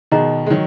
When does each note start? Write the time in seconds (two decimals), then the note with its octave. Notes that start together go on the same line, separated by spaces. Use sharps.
0.11 B2 D#3 G#4 D#5 F#5 A#5
0.46 G#3
0.50 D#3 F#3